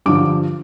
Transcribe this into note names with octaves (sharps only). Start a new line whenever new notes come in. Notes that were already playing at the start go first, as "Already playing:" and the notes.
G2 D3 F3 D6